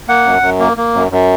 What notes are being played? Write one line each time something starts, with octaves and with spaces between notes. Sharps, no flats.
A#3 F#5
F#2
F#2
A#3
A#3
F#2
F#2